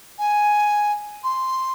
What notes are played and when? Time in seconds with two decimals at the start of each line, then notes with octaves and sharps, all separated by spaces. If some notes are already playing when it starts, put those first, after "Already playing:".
0.19 G#5
1.24 C6